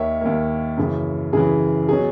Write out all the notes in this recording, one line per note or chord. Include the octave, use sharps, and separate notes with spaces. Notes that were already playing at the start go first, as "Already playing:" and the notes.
Already playing: D#2 D#3 A#3 C#5 E5
D#2 D#3 A#3
F#2 C#3 E3
F#2 C#3 E3 G#4
B2 F#3 C#4 G#4